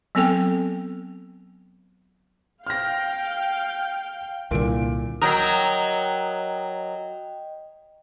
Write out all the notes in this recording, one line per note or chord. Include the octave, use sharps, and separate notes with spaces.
F#3 B3 C4 A4 G5
F5 G5 F6 A#6
C2 A#2 D3 G3 A#3 E4 D7
F#3 A#4 D#5 G5